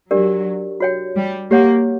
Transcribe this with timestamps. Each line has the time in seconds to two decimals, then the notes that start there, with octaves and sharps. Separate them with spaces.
0.11 F#3 D4 G4 A#4 D5
0.80 F#4 C#5 G5
1.16 G3
1.51 A#3 G4 C#5 F#5